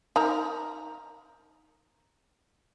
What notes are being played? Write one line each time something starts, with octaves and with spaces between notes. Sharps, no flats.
D#4 A#4 A#5